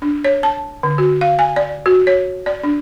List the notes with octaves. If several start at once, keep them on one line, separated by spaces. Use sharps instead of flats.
D4
C#5
A5
D3
F#4
F5
G#5
D5
F#4
C#5
D5
D4